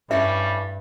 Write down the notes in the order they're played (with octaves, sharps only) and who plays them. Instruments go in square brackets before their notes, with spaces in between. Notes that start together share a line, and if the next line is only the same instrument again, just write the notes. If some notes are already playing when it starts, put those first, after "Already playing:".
[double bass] G2 [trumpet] G3 [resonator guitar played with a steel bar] A3 C#4 E4 [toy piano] E5